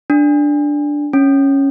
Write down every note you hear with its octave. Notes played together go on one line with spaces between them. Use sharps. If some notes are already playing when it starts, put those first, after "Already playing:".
D4
C#4